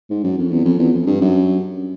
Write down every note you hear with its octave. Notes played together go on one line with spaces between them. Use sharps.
G#2
F#2
F2
E2
F2
E2
F2
G2
F#2